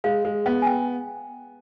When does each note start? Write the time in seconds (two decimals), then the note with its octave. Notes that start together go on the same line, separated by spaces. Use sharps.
0.04 G#3 F5
0.25 G#3
0.46 B3
0.62 G#5
0.67 G5